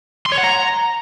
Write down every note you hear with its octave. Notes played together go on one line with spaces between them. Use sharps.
C6
C#5
F#5
A#5